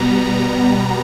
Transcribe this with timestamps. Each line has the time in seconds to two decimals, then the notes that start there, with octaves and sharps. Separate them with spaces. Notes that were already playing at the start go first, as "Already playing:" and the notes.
Already playing: B2 G3 B3 A#5
0.24 A#5